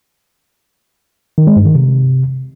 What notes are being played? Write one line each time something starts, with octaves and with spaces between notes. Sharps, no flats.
D#3
G#3
G2
D#3
C3